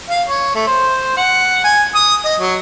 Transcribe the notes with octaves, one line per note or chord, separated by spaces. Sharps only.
F5
C#5
A3
C5
F#5
G#5
D#6
D#5
F#3